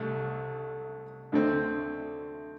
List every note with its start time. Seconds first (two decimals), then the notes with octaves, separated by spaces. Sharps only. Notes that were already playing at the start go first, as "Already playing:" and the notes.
Already playing: C2 C3 A3
1.32 D2 D3 A3 C4